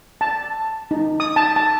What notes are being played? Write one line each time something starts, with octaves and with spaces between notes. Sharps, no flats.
A5
D#4
D#6
A5
A5